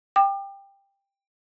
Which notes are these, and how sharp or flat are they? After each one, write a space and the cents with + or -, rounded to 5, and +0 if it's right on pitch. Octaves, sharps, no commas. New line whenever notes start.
G5 +15 D6 +40